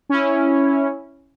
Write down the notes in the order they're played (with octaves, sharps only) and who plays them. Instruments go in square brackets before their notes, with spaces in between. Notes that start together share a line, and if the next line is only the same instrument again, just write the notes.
[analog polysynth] C#4 E4